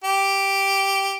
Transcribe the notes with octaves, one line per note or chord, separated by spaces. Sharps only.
G4